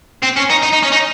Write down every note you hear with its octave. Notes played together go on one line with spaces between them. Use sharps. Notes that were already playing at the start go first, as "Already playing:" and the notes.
C4
C#4
D#4
D#4
D#4
C#4
D#4